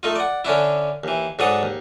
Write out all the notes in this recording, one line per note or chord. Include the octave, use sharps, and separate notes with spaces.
A3 D#4 F4
D5 F#5
D3 C#4 D4 E4
D#2 E3
G#2 F#3 D4 A4 F#5 D#6
D#2